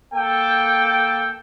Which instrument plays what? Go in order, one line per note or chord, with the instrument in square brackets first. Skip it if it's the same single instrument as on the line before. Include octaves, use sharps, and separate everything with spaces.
[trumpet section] A#3 A4 G5